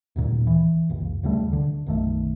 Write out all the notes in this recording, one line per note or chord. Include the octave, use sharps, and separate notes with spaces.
D#1 D2 A#2
E3
F#1 C#2
D2 C#3 G3 A3
D3
B1 F#2 D#3 A3